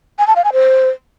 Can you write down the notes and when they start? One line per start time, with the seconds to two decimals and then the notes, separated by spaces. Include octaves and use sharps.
0.19 G#5
0.27 A5
0.36 F5
0.44 G#5
0.53 C5